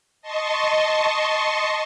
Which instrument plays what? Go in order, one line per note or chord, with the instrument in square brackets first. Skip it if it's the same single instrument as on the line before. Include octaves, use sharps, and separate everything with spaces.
[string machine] D#5 A5 C6 C#6